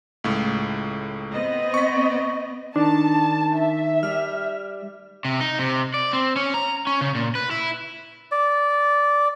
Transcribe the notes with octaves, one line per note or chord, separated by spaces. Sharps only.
C#2 A2
B3 C4 D#5
C#6 B6
D#3 D4 A5
E5
G3 F6
C3
D#4
C3
D5
C4
C#4
A#5
C#4
C#3
A#2
B4
E4
D5